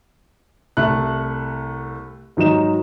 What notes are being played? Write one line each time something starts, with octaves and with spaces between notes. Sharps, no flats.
C2 A3 F#6
G#2 D#3 F#3 D#4 E7